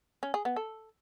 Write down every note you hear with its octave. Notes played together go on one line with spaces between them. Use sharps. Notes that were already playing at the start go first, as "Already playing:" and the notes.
C#4
G#4
B3
A4